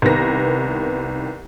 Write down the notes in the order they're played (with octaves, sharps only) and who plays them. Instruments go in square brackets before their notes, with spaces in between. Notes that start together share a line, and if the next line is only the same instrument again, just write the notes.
[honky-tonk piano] C2 D#3 B3 A#6